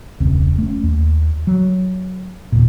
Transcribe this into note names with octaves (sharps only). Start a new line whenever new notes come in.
E1 C#2 C4
A3 C#4
D#2
F#3
E1 D#2 A#2